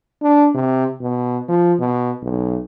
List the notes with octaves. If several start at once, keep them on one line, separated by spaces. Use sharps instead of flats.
D4
C3
B2
F3
B2
B1